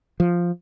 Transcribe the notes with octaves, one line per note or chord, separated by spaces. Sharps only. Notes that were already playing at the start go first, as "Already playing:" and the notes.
F3